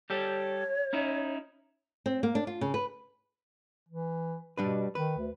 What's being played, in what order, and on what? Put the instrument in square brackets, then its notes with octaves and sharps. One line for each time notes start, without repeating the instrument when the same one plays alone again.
[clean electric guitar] G3 G4 A4 [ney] C#5
[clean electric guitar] C#4 D#4 E4
[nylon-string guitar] C4
A#3
D4
F4
C#3
B4
[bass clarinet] E3
[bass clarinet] B2 [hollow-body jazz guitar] G3 D4 B4
[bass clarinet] D#3 [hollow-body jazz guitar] B4
[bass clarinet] D2